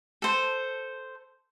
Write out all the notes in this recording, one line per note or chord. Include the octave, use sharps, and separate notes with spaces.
A4 C5